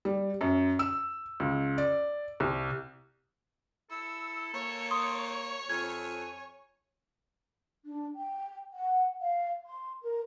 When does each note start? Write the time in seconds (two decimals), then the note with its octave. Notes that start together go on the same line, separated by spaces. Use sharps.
0.05 G3
0.41 F#2
0.79 E6
1.40 C#2
1.78 D5
2.40 C2
3.91 E4 A4 E6
4.54 A#3 C#5
4.91 C6 D#6
5.70 F2 G#5 G#6
7.84 D4
8.15 G5
8.72 F#5
9.20 F5
9.65 C6
10.01 A#4